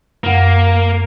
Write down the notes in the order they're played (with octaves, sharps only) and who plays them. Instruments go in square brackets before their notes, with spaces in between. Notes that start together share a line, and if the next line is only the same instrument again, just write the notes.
[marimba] F#2 F#5 [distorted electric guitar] A#3